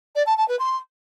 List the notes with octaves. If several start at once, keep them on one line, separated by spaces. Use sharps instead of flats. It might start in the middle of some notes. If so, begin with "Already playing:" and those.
D5
A5
A5
B4
C6